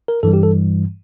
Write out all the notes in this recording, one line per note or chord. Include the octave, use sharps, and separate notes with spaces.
A#4
G2 E3 G3 A4
G4
A4